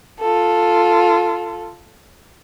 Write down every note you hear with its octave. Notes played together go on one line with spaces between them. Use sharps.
F4 A4